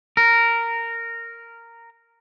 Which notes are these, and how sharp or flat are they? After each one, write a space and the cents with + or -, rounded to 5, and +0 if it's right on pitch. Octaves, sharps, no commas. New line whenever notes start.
A#4 -10